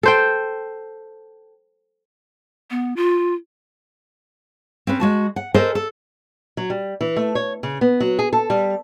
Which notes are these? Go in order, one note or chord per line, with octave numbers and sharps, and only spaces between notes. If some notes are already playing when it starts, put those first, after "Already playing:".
A4 C5 G5
B3
F4
C4 C#4 B4
G#3 F#4 A5
F#5
A4 A#4 C5 D#5 G#5
A4
F#3
G3
E3
A3
C#5
C#3
B3
F#3
G#4
A4
G3